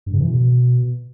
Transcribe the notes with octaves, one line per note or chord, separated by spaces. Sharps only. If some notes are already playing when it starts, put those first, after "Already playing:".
G2
C#3
E3
B2